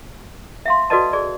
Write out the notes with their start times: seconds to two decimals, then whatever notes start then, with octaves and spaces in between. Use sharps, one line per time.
0.66 E5 F5 C6
0.90 F#4 A4 B4 D5 D#5 A5
1.13 G#4 D5